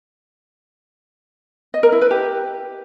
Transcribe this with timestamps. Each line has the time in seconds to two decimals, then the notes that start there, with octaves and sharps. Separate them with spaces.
1.74 D#5
1.83 A#4
1.92 E4
2.02 B4
2.11 G4